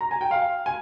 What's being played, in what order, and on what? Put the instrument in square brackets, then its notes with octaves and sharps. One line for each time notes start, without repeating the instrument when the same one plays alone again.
[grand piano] A#5
G#5
G5
F5
G#5